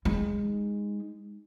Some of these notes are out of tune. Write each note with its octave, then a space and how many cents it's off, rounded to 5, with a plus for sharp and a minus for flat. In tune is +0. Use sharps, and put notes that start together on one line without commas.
G#3 -15 D#4 +0